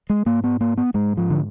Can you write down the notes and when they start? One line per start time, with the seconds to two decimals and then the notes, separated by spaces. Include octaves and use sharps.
0.10 G#3
0.26 G#2 A#3
0.44 B3
0.61 A#3
0.78 B3
0.94 G#2 G#3
1.17 F3
1.30 D3